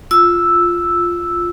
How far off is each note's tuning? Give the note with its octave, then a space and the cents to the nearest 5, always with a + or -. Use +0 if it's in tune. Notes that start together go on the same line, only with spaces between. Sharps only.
F4 +0 E6 +0